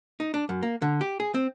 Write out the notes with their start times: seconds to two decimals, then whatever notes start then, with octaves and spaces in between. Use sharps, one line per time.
0.20 D#4
0.34 D4
0.49 F#2
0.63 A#3
0.82 D3
1.01 G4
1.20 G#4
1.34 C4